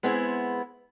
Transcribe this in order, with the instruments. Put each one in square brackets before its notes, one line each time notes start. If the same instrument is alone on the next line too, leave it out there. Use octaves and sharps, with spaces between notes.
[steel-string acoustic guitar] G#3 B3 C4 E4 G#4